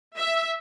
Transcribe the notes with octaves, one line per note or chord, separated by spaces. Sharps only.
E5